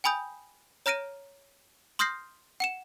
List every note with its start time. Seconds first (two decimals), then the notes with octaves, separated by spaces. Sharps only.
0.04 G5 G#5 B5 D#6 G6
0.86 C#5 A#5 F6 A#6 D7 D#7
1.99 C6 D#6 F6 G6 A#6 C7
2.60 F#5 C#7 E7